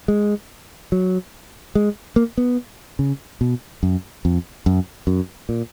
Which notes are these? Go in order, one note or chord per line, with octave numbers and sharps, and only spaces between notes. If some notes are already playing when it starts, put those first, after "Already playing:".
G#3
F#3
G#3
A#3
B3
C#3
B2
F#2
F2
F#2
F#2
A#2